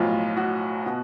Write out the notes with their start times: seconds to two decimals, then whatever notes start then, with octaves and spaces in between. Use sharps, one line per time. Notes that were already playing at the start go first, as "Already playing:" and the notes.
Already playing: B1 A2 F3 F4
0.37 F#4
0.86 B2